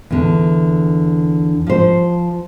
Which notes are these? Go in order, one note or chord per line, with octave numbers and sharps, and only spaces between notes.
E2 D3
F3 C5